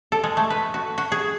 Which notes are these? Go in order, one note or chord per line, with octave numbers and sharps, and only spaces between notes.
A4
G#3
A3
B4
F#4
F#4
G#4